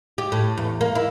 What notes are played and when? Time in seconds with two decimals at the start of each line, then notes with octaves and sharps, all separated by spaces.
0.18 G4
0.32 A2
0.58 E2
0.81 A#3
0.95 E4